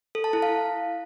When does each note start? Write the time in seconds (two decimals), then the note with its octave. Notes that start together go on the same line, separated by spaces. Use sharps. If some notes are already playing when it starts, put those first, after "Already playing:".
0.15 A4
0.24 A5
0.33 E4
0.42 F5